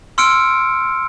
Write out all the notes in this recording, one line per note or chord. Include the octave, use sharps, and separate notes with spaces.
C6 E6 F6 C#7 D7